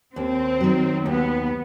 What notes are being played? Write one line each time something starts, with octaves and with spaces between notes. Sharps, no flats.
D#2 C4
D#3 F#3
D#2 B3